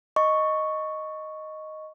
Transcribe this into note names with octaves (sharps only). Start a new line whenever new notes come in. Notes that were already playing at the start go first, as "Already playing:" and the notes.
D#5 C#6